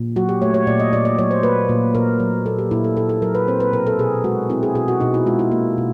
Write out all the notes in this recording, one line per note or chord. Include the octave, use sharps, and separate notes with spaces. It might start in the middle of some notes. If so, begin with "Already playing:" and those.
Already playing: A#2
F#3 F#4
G4
A3 C#5
C#5
A#2 D5
D#5
A#2 D5
D5
F#3 C#5
C5
A#3 B4
A#2
A#2 A#4
F#3
A#3 A4
G4
A#2 E4
A4
A#2 A4
A4
F#3 A#4
B4
C4 C5
B4
B2 A#4
A4
B2 G#4
G#3 F#4
C4 E4
G#4
B2 G#4
F#4
B2 D#4
E4
G#3 F4
E4
A#3
B2